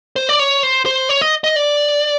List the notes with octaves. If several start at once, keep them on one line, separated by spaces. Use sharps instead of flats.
C5
D5
C#5
C5
C5
C#5
D#5
D#5
D5